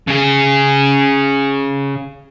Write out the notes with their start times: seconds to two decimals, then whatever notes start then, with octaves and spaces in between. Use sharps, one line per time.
0.07 C#3 G#4